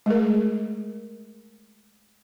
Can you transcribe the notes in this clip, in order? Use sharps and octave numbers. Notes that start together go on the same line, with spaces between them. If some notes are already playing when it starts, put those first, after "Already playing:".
G#3 A3 G#4 A#4